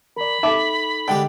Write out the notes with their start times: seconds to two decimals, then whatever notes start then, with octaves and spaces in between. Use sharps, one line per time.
0.17 A#4 D5 B5
0.43 D#4 A4 E5 A5 D6
1.08 D3 G#3 G4 G5